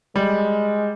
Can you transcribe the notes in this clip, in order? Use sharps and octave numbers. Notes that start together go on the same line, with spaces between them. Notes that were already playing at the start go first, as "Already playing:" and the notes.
G3 G#3